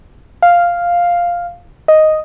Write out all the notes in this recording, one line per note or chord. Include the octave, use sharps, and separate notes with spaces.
F5
D#5